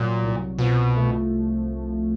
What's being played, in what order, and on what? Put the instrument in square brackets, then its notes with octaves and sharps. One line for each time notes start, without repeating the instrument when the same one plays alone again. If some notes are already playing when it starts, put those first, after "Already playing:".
Already playing: [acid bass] A#2 [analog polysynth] F#3
[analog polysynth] C2
[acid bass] B2 [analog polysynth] F3
[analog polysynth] A3